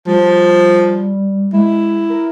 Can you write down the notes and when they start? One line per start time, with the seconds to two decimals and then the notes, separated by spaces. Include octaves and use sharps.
0.07 F3 G3
1.53 G#3 E4
2.10 A#4